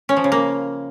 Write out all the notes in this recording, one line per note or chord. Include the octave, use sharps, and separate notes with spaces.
C#4
F3
C#3
A#3